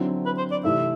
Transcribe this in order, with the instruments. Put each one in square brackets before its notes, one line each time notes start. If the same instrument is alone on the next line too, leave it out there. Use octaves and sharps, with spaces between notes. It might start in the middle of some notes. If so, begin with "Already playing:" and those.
Already playing: [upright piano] D3 F#3 C4 E4
[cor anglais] B4
C5
D5
[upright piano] C3 E3 A3 E4 [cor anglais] E5